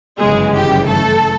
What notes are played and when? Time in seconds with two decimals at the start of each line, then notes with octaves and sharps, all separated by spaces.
0.19 G1 F#2 C#3 E3 G#3 G#4
0.54 G4
0.86 A3 A4